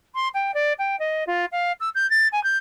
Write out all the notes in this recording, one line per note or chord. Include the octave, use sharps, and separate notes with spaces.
C6
G5
D5
G5
D#5
F4
F5
E6
G6
A6
G#5
G6